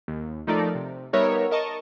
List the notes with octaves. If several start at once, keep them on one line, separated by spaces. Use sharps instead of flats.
D#2
F3 A3 D#4 A4 A#4 D5
C3
G3 B3 D#4 A#4 C#5 E5
A#4 D#5 A5 C#6